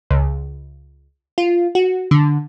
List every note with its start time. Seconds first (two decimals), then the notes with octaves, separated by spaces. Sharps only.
0.11 C#2
1.38 F4
1.75 F#4
2.11 D3